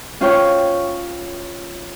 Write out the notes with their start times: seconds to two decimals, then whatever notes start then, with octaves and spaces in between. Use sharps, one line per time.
0.21 C#4 F4 C5 C#5 G5 C#6